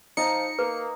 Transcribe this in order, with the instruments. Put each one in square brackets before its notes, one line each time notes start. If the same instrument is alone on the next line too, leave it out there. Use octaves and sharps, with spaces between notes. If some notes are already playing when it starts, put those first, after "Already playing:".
[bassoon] F3 [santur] D#4 [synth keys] C#7
[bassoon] A#3 [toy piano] B4